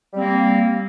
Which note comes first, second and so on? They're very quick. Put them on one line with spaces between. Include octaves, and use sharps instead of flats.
G3 C4 A#3